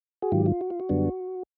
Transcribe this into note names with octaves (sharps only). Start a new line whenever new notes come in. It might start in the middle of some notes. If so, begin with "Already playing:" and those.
F#4 G#4
G#2 D#3 F#3 F4 G4
F4
F#4
F4
F#4
F#2 D3 G3 B3 D4